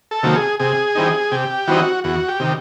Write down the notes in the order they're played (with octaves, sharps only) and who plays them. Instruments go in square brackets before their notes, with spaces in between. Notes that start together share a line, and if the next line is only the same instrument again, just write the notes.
[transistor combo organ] A4
C3 D#3 F#3 A#3
G#4
C3 G#4
E3 G3 C4 D#4
C3 G4
E3 G3 C4 D#4 F#4
E2 F#4
G4
C3 D#3